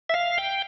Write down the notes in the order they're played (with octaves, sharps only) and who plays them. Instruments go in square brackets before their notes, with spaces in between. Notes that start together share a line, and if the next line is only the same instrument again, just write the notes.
[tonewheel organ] E5
F5
G5